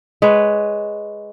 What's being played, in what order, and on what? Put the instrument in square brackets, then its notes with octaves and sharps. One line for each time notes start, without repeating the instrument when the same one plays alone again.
[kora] G#3 B4 C#5